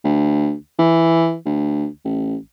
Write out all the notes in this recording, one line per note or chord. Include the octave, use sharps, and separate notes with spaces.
D2
E3
D2
A1